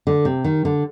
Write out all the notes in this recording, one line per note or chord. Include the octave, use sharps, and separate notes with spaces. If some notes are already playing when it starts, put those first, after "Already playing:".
D3
C3
D#3
D3